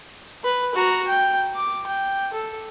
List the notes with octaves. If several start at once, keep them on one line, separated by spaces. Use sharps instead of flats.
B4
F#4 A#5
G5
D6
G5
A4